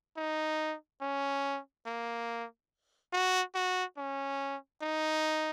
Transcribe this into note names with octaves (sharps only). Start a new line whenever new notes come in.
D#4
C#4
A#3
F#4
F#4
C#4
D#4